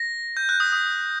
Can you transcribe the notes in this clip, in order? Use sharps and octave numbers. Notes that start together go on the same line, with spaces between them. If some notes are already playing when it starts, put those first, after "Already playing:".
Already playing: A#6
G6
F#6
D#6
D#6